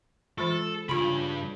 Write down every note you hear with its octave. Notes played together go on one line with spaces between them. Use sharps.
E3 G#3 F4 A4
G2 C#3 F4 B5 C6